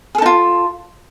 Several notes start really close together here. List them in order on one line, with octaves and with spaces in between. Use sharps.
G#4 A4 D#4 F4